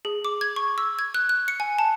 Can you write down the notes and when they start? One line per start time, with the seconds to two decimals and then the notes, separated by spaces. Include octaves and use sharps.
0.05 G#4
0.25 D6
0.41 G#6
0.56 C#6
0.78 E6
0.99 G#6
1.14 F#6
1.29 F#6
1.48 C#7
1.60 G#5
1.79 A5